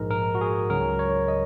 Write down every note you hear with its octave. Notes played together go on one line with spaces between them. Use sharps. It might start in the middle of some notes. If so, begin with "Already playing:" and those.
Already playing: A#1 G#2 G#3 A#4
A#4
F#4
G#4
C#2 C#3 F#3 A#4
C#5
D#5